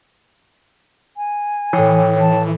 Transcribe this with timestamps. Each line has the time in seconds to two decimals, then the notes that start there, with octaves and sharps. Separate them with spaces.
1.17 G#5
1.73 A2 E3 C#5 G5 D#6 C7
2.20 A5